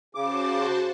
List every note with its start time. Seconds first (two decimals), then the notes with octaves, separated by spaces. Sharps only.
0.15 C#3 F#4 C5 A5 D6